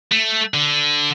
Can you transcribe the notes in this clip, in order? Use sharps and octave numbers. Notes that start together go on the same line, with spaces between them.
A3
D3